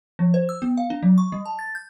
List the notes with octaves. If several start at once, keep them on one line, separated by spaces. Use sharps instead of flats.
F3
C5
E6
B3
F5
D4
F#3
C#6
G3
A5
A6
G6